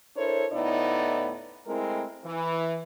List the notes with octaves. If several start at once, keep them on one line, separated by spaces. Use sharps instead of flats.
D4 E4 A4 A#4 C5 C#5
D2 A2 B3 D#4 E4 D5
G#3 A3 C4 E4 A#4
E3